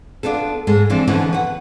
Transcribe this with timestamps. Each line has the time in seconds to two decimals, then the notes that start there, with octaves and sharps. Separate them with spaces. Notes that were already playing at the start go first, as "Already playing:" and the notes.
0.23 B3 D4 D#4 F4 A4
0.67 G#2 G#3 G#4 A4
0.90 E3 F3 C4 D4
1.07 D3 E3 F3 B3 C#4 D#4
1.33 B4 F#5